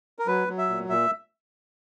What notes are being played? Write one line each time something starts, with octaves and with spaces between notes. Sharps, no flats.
A#4
F#3 B4
F#3
E5
A#2
A#2 E5